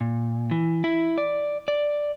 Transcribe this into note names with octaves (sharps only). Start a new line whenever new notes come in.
A#2
E3
E4
D5
D5